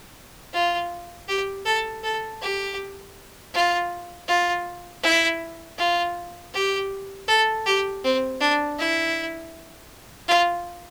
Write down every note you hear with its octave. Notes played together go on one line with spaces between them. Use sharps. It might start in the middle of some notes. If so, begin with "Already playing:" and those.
F4
G4
A4
A4
G4
F4
F4
E4
F4
G4
A4
G4
C4
D4
E4
F4